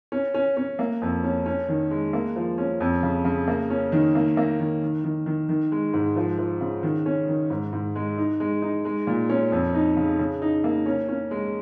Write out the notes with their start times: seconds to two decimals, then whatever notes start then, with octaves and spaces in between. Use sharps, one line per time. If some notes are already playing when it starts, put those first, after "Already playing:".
0.12 C#4
0.34 C#4
0.57 C#4
0.79 A#3
1.02 F2
1.24 C#4
1.46 C#4
1.68 D#3
1.91 G#3
2.13 A#3
2.36 F3
2.58 C#4
2.80 F2
3.03 C#3
3.25 C#3
3.48 A#3
3.70 C#4
3.92 D#3
4.15 A#3
4.37 A#3
4.59 D#3
4.82 D#3
5.04 D#3
5.26 D#3
5.49 D#3
5.72 G#3
5.93 G#2
6.16 F3
6.38 F3
6.61 C#3
6.83 D#3
7.06 C#4
7.28 D#3
7.50 G#2
7.73 G#2
7.95 G#3
8.18 D#4
8.40 G#3
8.62 D#4
8.85 G#3
9.07 A#2
9.29 C#4
9.52 F2
9.74 D#4
9.97 C#3
10.19 C#3
10.42 D#4
10.64 A#3
10.86 C#4
11.09 C#4
11.31 G#3